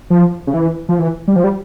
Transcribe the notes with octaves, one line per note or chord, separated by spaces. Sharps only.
F3
C#3
E3
F3
E3
G3
F3
G3